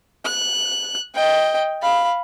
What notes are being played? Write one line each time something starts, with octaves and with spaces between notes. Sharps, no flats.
F#6
D#5 G5
F5 B5